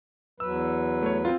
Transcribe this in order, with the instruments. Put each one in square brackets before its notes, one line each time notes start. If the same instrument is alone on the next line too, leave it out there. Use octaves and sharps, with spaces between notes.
[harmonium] E2 F#3 B4 [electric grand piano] E6
[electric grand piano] A3 C#5
C4 F4